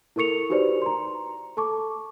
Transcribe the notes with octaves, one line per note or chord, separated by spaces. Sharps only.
E4 A4 A#4 C#6 C#7 F7
D#4 F#4 G4 B4 C5 D5
A#5 C6
A4 A5 C#6 D6